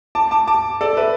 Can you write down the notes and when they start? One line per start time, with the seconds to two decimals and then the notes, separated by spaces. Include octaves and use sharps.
0.15 A5 D6
0.31 A5 D6
0.47 A5 D6
0.81 A4 D5
0.97 B4 E5